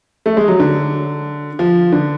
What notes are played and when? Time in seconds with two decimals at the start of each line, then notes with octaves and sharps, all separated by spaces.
0.26 A3
0.37 G#3
0.48 F#3
0.60 D3
1.59 F3
1.92 D3